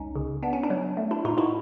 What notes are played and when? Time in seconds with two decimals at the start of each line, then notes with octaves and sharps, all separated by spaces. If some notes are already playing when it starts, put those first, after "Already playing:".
Already playing: C#2 C#4 D#4
0.15 C#3
0.43 B3 D4
0.53 C#4
0.63 D4
0.70 F#3
0.97 A3
1.11 D4 E4
1.25 A2 D#4 F4
1.38 E4 F#4